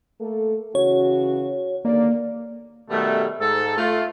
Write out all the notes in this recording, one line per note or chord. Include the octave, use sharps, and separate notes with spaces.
A3 A#3 A4
C#3 E3 F#4 C#5
D#2 D3 A#3 D5
B2 D#3 G3 A3
G#2 A4
A3 F4